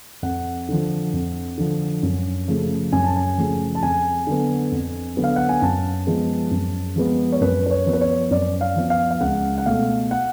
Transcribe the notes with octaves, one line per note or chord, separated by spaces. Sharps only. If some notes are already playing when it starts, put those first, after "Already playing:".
F2 F#5
D3 F3
F2
D3 F3
F#2
C#3 F3 A3
F#2 G#5
A5
G#5
C#3 F3 A3
A5
F2 G#5
D3 F#3 B3
F2
D3 F#3 B3
F5
F#5
G#5
F#2 A5
F3 G#3 B3
F#2
F3 G#3 B3
C#5
F#2 B4
B4
C#5
F3 B3
B4
C#5
F#2 D5
F5
F3 B3
F5
F5
C#2 F#5
F#5
B2 A3 F5
F#5